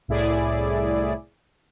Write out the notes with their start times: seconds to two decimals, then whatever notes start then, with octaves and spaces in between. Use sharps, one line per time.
0.08 C2 A2 E4 G#4 D5